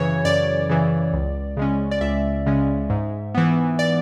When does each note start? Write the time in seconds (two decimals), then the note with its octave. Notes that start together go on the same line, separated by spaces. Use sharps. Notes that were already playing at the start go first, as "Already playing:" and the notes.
Already playing: F#2 C#3 E3 C#5
0.25 F#2 D5
0.69 C#3 E3
1.13 C#2
1.57 C#3 G#3 C#4
1.91 D5
2.01 C#2 E5
2.46 C#3 G#3 C#4
2.90 G#2
3.34 E3 B3
3.79 D5